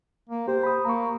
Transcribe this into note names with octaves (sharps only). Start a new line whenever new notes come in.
A#3
G4 C5
B5 D#6
A#3 A#5 C#6